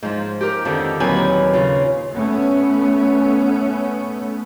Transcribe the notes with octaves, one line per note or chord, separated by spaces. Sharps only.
G#2 F3
G4 A#4
F2 D3 D#3
D#2 A#2 F#3 C4 B4 G#5
C#3 F4
A3 B3 C#4